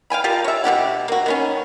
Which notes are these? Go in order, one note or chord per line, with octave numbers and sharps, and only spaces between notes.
F5 G5 G#5 B5
F4 G4 A#4 A5
C#5 E5
B2 D4 G4 F#5
A#3 F#4
D#3 B3 C#4